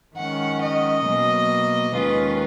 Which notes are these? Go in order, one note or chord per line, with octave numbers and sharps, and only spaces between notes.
D#3 G#3 C#4 F#5
D#5
B2 F#3 A#3
D#2 D#3 G#3 C#4 F4 B4